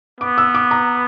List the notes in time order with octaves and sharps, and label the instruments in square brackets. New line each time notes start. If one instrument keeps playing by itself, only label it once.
[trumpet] B3 [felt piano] D6
[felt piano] E6
D6
A#5